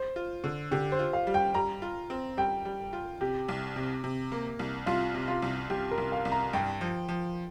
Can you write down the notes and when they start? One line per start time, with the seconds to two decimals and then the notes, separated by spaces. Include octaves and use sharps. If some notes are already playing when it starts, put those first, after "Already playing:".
Already playing: C5
0.16 F4
0.44 D3
0.71 D3 G4
0.92 C5
0.99 F4
1.13 F5
1.27 G3
1.34 G5
1.54 G3 A#5
1.82 F4
2.10 C4
2.37 G3 G5
2.65 G3
2.93 F4
3.21 C3 G4
3.48 C2
3.76 C3
4.04 C3
4.32 A#3
4.59 C2
4.86 C2 F4
5.14 C3
5.28 F4
5.42 C2
5.70 C2 G4
5.91 A#4
5.98 C2
6.12 F5
6.25 C2
6.32 A#5
6.53 G2 G5
6.81 F3
7.08 F3